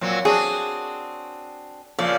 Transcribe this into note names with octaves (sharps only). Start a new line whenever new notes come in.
A#2 F#3 C4
C4 D4 F#4 G#4
A#2 C#3 F3 D5